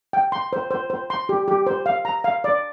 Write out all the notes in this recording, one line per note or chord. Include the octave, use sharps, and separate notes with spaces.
G5
C6
C5
C5
C5
C6
G4
G4
C5
F5
A#5
F5
D5